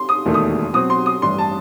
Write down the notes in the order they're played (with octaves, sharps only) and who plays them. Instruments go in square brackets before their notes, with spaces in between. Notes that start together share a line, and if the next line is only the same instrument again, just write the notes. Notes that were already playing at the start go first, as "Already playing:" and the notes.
Already playing: [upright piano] C6
D#6
[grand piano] E1 D#2 D#3 A3
[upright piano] D#6
[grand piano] B2 F#3 C4 [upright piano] D#6
[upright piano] C6
D#6
[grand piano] A1 G2 E3 [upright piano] C6
[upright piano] A5